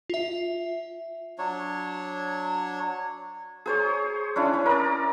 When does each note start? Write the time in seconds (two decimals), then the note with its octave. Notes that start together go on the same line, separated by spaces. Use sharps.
0.10 F4 E5
1.38 F#3 D4 C#5
3.66 G#4 C5 C#5
4.36 C#4 D4 E4
4.53 C#4
4.66 A#4 D5